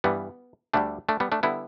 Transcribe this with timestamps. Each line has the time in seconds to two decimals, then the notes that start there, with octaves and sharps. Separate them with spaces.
0.04 G2 E3 G3 B3
0.74 D2 D3 G3 A3 D4
1.09 A3 D4
1.20 G3 B3
1.32 A3 D4
1.43 D3 G3 B3 E4